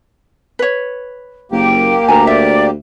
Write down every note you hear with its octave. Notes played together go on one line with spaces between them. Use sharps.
B4 C#5
F#1 A#3 G4 G5
D2 A#4 D5 G#5 A#5
D5 E5